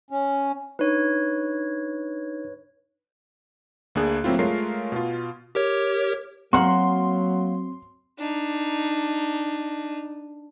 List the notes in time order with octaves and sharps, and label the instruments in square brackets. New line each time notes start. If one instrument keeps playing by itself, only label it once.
[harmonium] C#4
[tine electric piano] D4 D#4 [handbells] B4 C#5
[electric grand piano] D2 A#3 D4 G#4 F#6
F#3 A3 A#3 C4 E4 F4
G#3 A3 F4 A#4 C#5 C7
B2 F4
[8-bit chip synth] G4 A#4 C#5
[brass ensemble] F#3 [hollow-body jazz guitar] A#3 F#5 [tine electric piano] C4 [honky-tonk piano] C6
[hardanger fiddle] D4 D#4